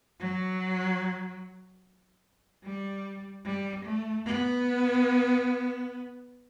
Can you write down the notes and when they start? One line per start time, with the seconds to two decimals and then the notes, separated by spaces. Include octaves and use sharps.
0.20 F#3
2.63 G3
3.45 G3
3.85 A3
4.26 B3